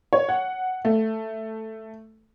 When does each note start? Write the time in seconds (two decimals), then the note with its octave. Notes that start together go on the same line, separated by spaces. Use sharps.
0.13 C#5
0.29 F#5
0.85 A3